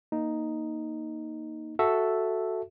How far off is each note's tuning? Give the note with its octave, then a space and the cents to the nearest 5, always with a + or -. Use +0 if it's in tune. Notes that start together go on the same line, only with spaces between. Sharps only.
A#3 +0 D#4 +0
F#4 +0 A4 +0 E5 +5